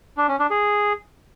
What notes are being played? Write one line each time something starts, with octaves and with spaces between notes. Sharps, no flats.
D4
C#4
D4
G#4